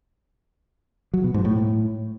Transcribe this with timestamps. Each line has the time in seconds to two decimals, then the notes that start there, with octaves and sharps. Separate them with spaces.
1.14 F#3
1.24 B2
1.34 G#2
1.45 A2